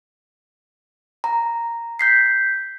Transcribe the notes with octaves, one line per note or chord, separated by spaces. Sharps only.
A#5
G6 B6 C7